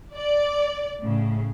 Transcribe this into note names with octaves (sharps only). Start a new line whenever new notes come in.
D5
A2 C#3